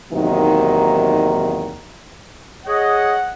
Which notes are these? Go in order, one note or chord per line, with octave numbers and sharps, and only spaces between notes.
E2 C3 D#3 F#3 A#3 D#4
G#4 C#5 D#5 F#5